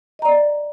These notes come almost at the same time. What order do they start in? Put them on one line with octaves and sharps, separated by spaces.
D#5 A#5 D5